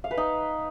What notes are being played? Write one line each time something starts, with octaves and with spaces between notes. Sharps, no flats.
F5
B4
D#4